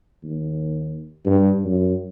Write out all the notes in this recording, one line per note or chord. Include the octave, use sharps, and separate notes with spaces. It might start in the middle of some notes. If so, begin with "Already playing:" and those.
D#2
G2
F#2